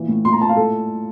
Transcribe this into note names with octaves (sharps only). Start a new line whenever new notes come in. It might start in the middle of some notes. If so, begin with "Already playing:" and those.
Already playing: A#2 E3
A2
A#2 C6
A#5
A#2 A5
F5
A2 A4